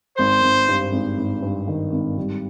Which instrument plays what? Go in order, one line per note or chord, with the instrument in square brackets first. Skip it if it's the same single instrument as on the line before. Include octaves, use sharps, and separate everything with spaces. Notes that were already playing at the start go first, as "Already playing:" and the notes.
[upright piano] G#1 [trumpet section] C5
[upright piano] G#1
G2
G#1
G#1
G2
D#3
G#1
G3